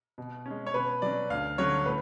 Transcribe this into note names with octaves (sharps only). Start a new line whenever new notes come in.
B2
G#3 C#4
C#5
B2 B4
F#3 C#4 D5
D2 F5
D3 F#3 C#4 C#5
A2 B4